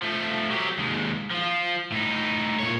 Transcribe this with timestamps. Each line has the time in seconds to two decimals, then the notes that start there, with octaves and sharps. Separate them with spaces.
0.03 F3 A3
0.51 F#3 G4
0.79 D#2 G#3
1.31 F3 F4
1.92 A2 D#4
2.59 A#2 C#5